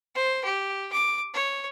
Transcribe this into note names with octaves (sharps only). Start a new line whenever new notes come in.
C5
G4
D6
C#5